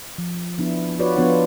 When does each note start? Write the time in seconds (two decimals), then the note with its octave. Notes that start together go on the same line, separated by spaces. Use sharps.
0.18 F3
0.58 F3 B3 D4 E4
0.99 F4 F#4 B4 C#5 D5
1.16 F3 B3 D4 F4 C#5 F#5